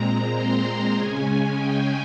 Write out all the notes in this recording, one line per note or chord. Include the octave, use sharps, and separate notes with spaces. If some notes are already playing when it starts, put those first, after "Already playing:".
Already playing: A#2 G#3 C4 A#5
C6
A#5
C#3 G#3 C#4 G#5
G5